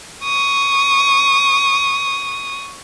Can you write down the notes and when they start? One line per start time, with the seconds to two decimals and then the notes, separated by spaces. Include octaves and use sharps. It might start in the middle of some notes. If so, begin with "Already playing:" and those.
0.23 C#6 D#6